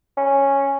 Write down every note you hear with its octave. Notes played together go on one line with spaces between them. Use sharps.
C#4